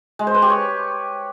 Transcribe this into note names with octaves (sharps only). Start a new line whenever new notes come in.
G#3
C5
B4
G4
C#5